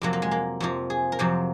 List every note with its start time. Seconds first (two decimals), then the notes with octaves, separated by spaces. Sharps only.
0.02 F2 C3 F#3 A#3
0.13 A#3
0.22 G#3
0.31 A#3
0.60 F2 C3 F3
0.90 G#4
1.12 A#4
1.19 F2 C3 F#3 C5